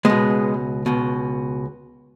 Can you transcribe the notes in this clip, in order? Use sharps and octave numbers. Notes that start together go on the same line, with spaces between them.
C#2 B2 G#3 B3
C#2 B2